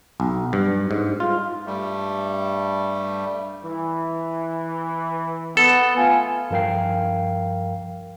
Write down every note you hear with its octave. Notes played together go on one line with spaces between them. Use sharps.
B1
G2
G#2
F4
G2 G3 A3
E3
B3 A4
A3 F4 G#5
G2 F3 A#4 F5 G5 C7